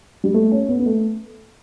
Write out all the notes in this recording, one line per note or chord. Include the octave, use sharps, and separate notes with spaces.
G3
A3
C#4
B3
B3
A3